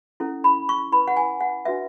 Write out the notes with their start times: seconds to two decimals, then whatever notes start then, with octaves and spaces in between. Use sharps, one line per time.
0.20 C#4 E4 A4
0.44 B5
0.69 C#6
0.92 E4 B4 B5
1.08 F#5
1.17 G#5
1.41 F#5
1.65 D4 F#4 B4 E5